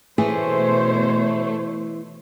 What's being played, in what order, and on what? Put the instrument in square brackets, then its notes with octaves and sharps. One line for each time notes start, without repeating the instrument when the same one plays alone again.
[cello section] B2 C5 C#5 [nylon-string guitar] E3 G#4 [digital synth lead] A3